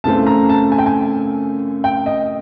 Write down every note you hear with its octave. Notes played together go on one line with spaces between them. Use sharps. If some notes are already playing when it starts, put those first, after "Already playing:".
F#2 C#3 E3 A3 C4 A5
A#5
A5
G#5
G5
G#5
G5
D#5